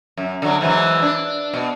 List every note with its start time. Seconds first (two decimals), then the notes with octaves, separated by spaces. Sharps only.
0.17 F#2
0.42 D3 F#3
0.61 G#2 E3 F#3
1.02 D4
1.54 B2